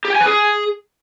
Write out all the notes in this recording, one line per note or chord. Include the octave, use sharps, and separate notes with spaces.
G4
G5
G#5
B4
G#4